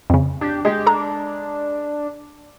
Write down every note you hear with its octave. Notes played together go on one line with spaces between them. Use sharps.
F2 C#3
D4 G4
G#3 G4
D4 A4 A#5